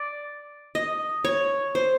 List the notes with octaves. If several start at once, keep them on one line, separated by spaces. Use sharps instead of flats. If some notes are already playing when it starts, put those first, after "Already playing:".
Already playing: D5
D#5
C#5
C5